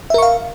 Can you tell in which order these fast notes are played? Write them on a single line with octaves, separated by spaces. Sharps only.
E5 A#4 C#6 F5